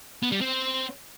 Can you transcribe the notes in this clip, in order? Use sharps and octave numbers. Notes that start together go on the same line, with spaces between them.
B3
G3
C4